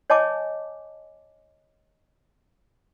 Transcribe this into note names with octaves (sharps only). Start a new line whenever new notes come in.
C#5 D#5 G#5 A5 D6